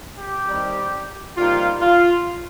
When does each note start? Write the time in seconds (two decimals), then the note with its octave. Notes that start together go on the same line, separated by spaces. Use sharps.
0.17 G4
0.46 D#3 G3 C4 D#4
1.36 C3 G3 A#3 D#4 F4
1.81 F4